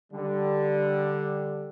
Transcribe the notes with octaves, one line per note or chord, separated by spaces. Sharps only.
D3 G3